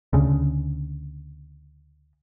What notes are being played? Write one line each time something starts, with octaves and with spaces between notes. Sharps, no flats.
D2 C#3